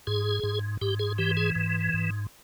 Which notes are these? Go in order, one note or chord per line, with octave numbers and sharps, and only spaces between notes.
G#2 G#4
G#2
G#2 G4
G#4
E3 G4
G#4
G#2
G#2